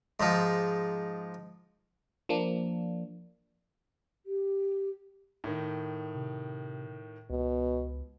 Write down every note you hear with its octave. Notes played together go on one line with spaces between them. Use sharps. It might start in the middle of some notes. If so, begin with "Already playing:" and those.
G#2 F3
F3 A#3 D4
G4
A2 D#3
C3
C#2 B2